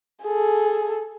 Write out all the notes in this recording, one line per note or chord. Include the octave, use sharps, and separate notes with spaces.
G#4 A4